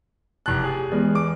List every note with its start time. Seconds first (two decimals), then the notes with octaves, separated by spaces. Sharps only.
0.46 F1 A5 F#6
0.64 G4 G#4
0.92 E2 G#3
1.15 D6